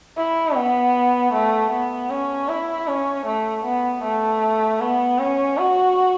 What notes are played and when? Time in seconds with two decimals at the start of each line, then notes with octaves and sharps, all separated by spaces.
0.17 E4
0.56 B3
1.33 A3
1.71 B3
2.10 C#4
2.48 E4
2.87 C#4
3.26 A3
3.64 B3
4.03 A3
4.80 B3
5.19 C#4
5.58 F#4